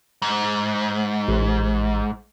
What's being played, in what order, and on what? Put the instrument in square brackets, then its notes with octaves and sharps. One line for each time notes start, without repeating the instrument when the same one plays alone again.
[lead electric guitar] G#2
[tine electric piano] A1